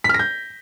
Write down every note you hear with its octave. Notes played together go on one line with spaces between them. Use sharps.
B6
F6
A#6
G6